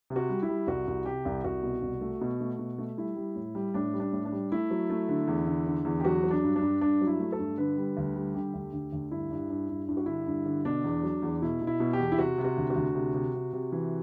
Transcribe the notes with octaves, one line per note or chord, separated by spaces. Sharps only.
C3
F#4
G3
E4
G3
C2 F#4
C2
C3 G4
C2
C2 F#4
B2
C2
A3
B2
A3
B2
A3
G3 E4
G3
A2
G3
A2 D4
G3
D4
A2
D4
G3
A3 E4
F#3
A3
D3
E2
D3
D3
E2
G4
F#3 F#4
F#3
D4
G2
D4
G2
G2 D4
F#3
E4
A3
A4
G2
D3 B4
G3
D2
G3
D3 G4
D2
D2
D2
G2 E4
G2
G2
G2
G2 E4
F#4
D3 E4
G2
D3
B2 D4
E2
F#3
E2
B2 E4
B2
E4
B2
G4
E2
E4
C3 F#4
C3
F#4
D2
F#4
D2
C3
C3
C3
C3
E3